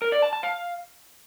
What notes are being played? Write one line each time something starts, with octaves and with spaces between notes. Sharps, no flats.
A#4
D5
A5
A5
F5